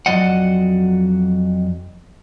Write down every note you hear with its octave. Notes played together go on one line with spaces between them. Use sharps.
F2 F#3 F#4 D5 D#5 F#5